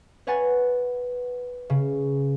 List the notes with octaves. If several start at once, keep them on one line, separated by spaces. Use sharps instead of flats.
B4 C#5 F#5 G#5 F#6 A6
C#3